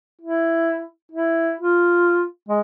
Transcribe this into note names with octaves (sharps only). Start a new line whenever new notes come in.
E4
E4
F4
G#3